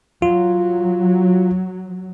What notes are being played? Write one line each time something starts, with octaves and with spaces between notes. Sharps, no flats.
F#3 F4